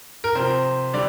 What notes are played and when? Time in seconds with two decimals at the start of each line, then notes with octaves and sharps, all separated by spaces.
0.24 A#4
0.35 C3 F3 C5
0.93 D3 G3 D5